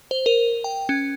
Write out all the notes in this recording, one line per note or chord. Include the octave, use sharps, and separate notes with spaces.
C5
A#4
G5
C#4